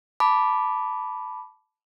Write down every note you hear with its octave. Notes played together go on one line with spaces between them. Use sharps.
A5 B5 D6